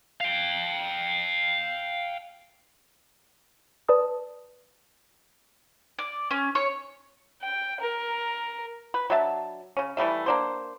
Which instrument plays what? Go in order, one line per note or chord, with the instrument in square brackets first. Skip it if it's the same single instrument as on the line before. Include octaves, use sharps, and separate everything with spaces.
[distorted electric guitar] F5 G5
[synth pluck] B4 D5 A5 D#6
[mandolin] D5
C#4
C#5
[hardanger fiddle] G5
A#4
[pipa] B4
F#3 D4 E5 A5
C#3 C#4
E3 G3 A3 E5
A#3 D4 C5